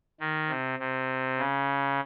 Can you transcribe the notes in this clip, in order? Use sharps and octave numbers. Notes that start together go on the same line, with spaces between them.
D#3
C3
C3
C#3